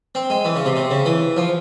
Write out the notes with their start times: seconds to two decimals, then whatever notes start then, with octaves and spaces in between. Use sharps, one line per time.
0.15 C4
0.30 G#3
0.45 E3
0.56 C#3
0.65 C3
0.76 C3
0.91 C#3
1.06 E3
1.37 F3